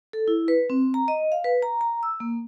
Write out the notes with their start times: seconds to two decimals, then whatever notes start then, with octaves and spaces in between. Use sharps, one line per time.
0.13 A4
0.28 E4
0.48 B4
0.70 C4
0.94 A#5
1.08 D#5
1.32 F5
1.44 B4
1.63 A#5
1.81 A#5
2.03 E6
2.20 A#3